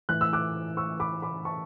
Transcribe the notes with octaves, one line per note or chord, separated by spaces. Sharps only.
A2 E3 F#6
E6
D6 F#6
C#6 E6
B5 D6
B5 D6
A5 C#6